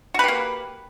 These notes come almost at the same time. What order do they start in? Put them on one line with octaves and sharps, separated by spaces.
F#4 B4 G4 A#3